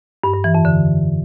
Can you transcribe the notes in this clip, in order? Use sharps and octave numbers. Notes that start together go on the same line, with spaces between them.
G2
G2
E3
F2
D3